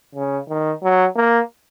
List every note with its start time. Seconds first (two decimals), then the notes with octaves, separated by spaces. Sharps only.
0.15 C#3
0.49 D#3
0.83 F#3
1.16 A#3